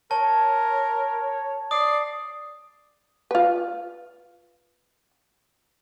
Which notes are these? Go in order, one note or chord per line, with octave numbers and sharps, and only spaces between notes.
A#4 C#5 A5
D5 D#6 C7
F4 B4